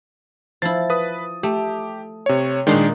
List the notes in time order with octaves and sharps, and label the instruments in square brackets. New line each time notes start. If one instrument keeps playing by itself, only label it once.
[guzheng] F3 E4 [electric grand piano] A6
[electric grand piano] B4 D#6
[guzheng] A3 [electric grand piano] G4
[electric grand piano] C3 C#5
[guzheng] A#2 D#4 C6 [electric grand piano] D#3 G#3 D4